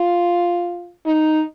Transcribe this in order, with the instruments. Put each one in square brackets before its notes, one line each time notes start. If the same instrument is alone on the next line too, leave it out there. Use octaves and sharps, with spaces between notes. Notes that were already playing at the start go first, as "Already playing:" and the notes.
Already playing: [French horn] F4
D#4